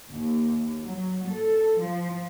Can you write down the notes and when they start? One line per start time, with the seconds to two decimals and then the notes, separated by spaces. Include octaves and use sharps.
0.11 D#2
0.84 F#3
1.29 A4
1.80 F3